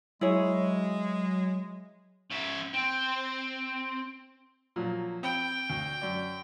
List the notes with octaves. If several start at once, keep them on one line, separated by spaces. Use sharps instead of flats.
F#3 G#3 E4 G#4 C#5
C#4 E5
C4
A#2 F3 F#3
C4 G5 B5
D2
F#2 D5